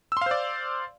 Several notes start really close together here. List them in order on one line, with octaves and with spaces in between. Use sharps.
E6 C6 F5 C5 D5